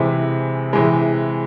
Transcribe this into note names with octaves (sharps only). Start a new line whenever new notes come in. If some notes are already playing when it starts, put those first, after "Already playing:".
Already playing: C3 E3 G#3
C3 E3 G#3